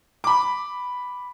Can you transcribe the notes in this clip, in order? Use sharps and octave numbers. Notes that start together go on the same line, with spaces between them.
B5 D6